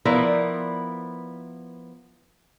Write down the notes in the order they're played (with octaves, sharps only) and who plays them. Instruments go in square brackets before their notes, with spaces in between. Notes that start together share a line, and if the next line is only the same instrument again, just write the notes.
[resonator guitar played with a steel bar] F3 B3 E4 A#4 B4 D5